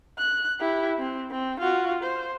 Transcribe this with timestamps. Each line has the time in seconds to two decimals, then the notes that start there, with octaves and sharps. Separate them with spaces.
0.19 F#6
0.60 E4 G4
0.99 C4
1.31 C4
1.60 F4 F#4
2.04 C5